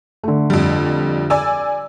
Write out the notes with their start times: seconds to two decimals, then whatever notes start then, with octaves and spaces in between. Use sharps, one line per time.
0.23 D3 A3
0.50 F2 G3
1.30 D5 G#5 E6